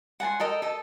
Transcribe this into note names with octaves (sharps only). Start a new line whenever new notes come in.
F#5 G#5 A5 C6
A4 A#4 D#5 G5
A4 D#5 A5